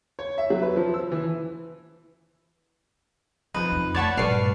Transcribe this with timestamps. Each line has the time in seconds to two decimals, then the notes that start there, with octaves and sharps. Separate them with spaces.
0.19 C#5
0.38 E5
0.50 F#3
0.62 B4
0.76 F3
0.94 E6
1.12 E3
3.54 F2 F3 D#4 B4
3.72 F2
3.95 G#3 A3 C#5 D5 F#5 A5 B5 C#6
4.17 G2 A#2 B4 D5 A5 C#6 F6 C7